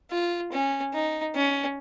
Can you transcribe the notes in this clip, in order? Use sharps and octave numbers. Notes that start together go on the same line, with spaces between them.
F4
C#4
D#4
C#4